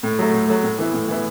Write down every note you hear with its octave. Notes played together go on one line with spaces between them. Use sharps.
A2
F#3 A3
A2
F#3 A3
A2
E3 B3 E4
A2
E3 B3 E4